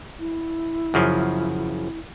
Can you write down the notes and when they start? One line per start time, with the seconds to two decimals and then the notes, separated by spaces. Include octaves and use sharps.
0.19 E4
0.94 F#2 C#3 F3